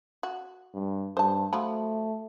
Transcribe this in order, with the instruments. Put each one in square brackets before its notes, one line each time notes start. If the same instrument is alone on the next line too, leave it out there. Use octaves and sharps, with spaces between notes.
[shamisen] F#4
[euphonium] G2
[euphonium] G2 [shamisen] C5 A5
[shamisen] F3 F#3 B5 [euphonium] A3